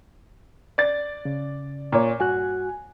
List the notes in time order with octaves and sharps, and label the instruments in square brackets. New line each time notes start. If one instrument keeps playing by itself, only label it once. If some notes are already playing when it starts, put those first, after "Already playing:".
[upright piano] D5 A6
[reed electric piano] C#3
[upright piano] A#2 C#5
[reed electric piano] G2 F#4 F#6 [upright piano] G#5